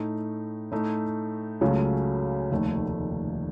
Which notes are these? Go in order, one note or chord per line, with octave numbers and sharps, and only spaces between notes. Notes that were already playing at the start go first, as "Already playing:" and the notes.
Already playing: A2 A3 D#4
A2 A3 D#4
C#2 C#3 F#3 A3 C#4
F1 D#2 D#3 A3